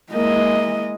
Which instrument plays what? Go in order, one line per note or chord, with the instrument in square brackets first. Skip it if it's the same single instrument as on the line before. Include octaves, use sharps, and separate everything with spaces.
[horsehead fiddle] G#3 D#5 [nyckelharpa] A#3 E4